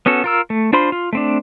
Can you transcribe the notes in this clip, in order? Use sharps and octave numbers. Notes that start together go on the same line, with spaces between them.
B3 C#4 F#4 A4
F4 A#4 E6
A3
D4 F4 C5 B5 C6
F4
A3 C4 D4